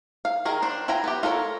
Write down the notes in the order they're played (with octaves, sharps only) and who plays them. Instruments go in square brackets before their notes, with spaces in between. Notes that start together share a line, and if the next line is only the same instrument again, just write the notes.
[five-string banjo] F5
D#3 G#4 A#4
D4 C5
E4 F4 G5 G#5 A#5
B3 G4
F4 A4 A#4 C#5